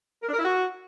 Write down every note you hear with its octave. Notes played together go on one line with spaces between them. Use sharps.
A#4
D4
A#4
E4
F#4